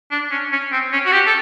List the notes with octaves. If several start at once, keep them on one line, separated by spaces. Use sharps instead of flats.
D4
C#4
C#4
C4
C#4
F#4
G4
A4